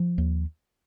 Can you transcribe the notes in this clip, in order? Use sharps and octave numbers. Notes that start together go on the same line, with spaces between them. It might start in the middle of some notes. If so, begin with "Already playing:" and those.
Already playing: F3
D#2